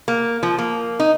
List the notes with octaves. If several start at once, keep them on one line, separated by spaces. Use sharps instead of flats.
A#3
F3
A#3
D#4